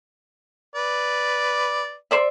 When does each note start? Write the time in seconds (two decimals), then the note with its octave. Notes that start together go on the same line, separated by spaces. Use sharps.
0.75 B4 D5
2.11 C5 D5 E5